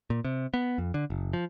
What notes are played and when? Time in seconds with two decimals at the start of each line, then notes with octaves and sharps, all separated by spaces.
0.10 A#2
0.24 C3
0.54 B3
0.78 F2
0.94 D3
1.10 F#1
1.33 F3